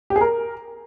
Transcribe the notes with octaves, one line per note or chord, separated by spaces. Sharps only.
G4
G#4
A#4